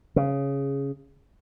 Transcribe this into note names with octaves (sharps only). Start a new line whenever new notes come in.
C#3